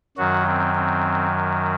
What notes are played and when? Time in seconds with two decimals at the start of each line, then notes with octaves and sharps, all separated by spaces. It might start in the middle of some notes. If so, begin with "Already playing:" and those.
0.17 F#2 D#3 F#3 F#4
0.46 C4
0.75 C4